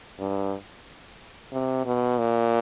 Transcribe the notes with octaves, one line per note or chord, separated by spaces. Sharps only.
G2
C3
B2
A#2